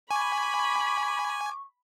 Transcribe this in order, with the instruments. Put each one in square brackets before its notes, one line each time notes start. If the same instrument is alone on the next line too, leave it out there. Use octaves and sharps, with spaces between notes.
[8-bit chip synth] G#5 [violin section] B5 [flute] C#6 [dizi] D6